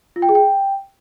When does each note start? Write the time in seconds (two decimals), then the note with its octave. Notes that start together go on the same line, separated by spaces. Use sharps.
0.16 F4
0.22 G5
0.29 G#4
0.35 G5